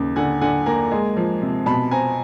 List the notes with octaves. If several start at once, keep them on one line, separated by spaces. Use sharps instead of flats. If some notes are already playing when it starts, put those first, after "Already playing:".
Already playing: D#2 C#3
D3 F#5 G#5
D3 F#5 G#5
A#3 G#5 A#5
G#3
F3
C3
B2 A5 B5
C4 G#5 A#5